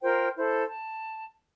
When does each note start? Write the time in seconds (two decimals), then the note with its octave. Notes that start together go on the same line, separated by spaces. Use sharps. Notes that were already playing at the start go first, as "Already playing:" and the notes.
0.02 F4 A#4 C5 G5
0.37 E4 A4 C5
0.67 A5